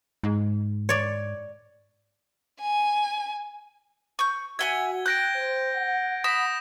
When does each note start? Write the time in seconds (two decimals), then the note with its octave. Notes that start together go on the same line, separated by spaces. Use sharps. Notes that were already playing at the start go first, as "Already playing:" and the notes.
0.24 G#2
0.89 C#5 D5
2.60 G#5
4.19 C#6 G6
4.59 F#4 E5 F#5 G#5 G#6 G7
5.06 G5 F#6 G6 A#6 D7
5.35 C5
5.75 F#5
6.24 B5 D#6 A#6 E7